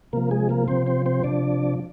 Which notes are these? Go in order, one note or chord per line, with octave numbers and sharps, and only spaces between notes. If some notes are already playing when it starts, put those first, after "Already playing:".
C3 F3 A#3 A#4
G#3 G#4
A#3 A#4
C3 F3 C4 C5
C4 C5
C4 C5
C3 F3 D4 D5